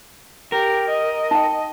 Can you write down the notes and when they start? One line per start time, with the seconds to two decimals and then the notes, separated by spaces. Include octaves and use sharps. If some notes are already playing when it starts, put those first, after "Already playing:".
0.52 G4 A#4
0.89 D#5
1.31 D#4 G5